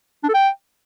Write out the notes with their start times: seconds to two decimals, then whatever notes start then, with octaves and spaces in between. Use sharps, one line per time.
0.24 D4
0.29 A4
0.34 G5